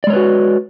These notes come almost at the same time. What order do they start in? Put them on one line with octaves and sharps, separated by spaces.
D5 G#3 C#5 B4 F#4